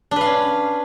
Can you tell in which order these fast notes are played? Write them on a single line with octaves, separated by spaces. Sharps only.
D4 B4 F5 C#4